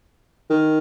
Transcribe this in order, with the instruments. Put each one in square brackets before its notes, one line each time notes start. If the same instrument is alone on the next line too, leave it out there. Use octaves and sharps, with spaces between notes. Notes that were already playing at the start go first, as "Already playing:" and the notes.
[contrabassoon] D#3